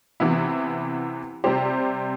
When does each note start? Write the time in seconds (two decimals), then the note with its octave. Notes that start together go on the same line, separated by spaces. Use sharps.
0.20 C3 E3 B3 E4
1.44 C3 G3 C4 G4 C5